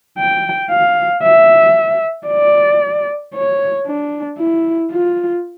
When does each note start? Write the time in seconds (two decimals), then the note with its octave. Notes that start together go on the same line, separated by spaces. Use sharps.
0.18 G5
0.70 F5
1.23 E5
2.28 D5
3.34 C#5
3.86 D4
4.38 E4
4.91 F4